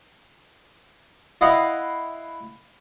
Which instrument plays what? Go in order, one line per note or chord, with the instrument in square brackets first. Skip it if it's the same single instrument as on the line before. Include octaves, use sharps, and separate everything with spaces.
[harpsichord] E4 D#5 F5 F#5